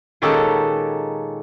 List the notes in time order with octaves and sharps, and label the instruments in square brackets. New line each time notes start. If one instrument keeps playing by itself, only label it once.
[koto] A#2 D#3 G#3 C#4 G4 A4